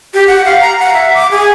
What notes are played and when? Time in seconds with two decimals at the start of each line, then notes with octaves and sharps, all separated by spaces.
0.14 G4
0.27 F#5
0.45 F5
0.61 A#5
0.79 F#5
0.94 E5
1.14 D6
1.31 G#4